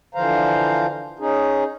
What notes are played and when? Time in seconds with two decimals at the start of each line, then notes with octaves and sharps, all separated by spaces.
0.15 D3 E3 F3 C5 F5 A#5
1.19 C#4 D#4 G#4